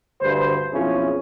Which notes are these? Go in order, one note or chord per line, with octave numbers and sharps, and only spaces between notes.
D2 G2 D3 B4 C5
B1 F2 F3 C#4 E4 G#4